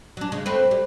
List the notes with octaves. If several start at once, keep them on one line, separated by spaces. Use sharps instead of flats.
F#3 D4
C#3 G#3
A3 C4 B4
G3